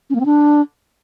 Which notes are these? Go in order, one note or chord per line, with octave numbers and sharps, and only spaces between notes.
C#4
A#3
C4
D4